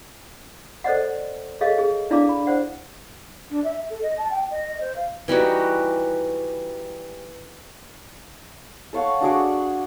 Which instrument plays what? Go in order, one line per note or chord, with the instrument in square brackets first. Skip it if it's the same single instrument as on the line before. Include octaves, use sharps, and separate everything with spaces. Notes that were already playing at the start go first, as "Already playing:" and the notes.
[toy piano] A4 C5 D5 D#5 F#5
G#4 A4 C#5 D#5 F5
G#4
D4 E4 D5 F5 A5 D6
B5
C5 D5 F#5
[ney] D4
E5
A4
D#5
A5
G5
D#5
C5
F5
[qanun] E3 G3 D#4 F#4
[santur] A4 C#5 F5 F#5
D4 F#4 G#4 D5